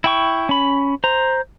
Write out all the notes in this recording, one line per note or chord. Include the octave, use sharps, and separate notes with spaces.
E4 G5 C#6
C#4 B5
C5 A#5